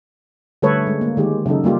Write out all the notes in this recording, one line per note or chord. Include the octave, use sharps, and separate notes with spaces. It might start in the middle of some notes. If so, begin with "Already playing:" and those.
D3 G3 A3 A4 B4 C#5
G#3
A#3
D#3 G#3 G4
C#3 F#3 D#4 A4
G3 A#3 F4 G4